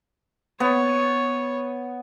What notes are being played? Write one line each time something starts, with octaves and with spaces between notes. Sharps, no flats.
B3 C#5